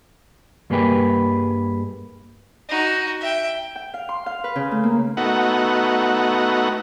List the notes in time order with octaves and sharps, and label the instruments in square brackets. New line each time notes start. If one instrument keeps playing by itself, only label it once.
[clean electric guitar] G2 G3 A#3 G#4 B4 G5
[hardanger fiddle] D#4 F#4
E5 G5
[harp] G5
F5
C6
F5
B4
C#3
A3
A#3
[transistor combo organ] A3 B3 D#4 F#4 F#5